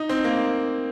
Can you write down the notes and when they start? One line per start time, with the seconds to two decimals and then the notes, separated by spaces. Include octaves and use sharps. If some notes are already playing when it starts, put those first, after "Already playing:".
Already playing: D#4
0.09 C4
0.24 A#3